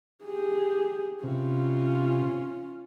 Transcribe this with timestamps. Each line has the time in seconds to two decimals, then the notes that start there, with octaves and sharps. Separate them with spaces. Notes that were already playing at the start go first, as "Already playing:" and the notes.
0.24 G4 G#4
1.23 C3 C#4 F4